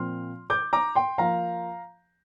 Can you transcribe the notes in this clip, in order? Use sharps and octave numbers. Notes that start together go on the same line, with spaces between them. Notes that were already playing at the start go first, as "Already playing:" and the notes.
Already playing: A#2 F3 C4 F4 C6 F6
D6 G6
A#5 D6
G5 C6
F3 A#3 F4 F5 A#5